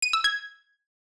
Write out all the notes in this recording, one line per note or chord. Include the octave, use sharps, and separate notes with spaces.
D#7
E6
G#6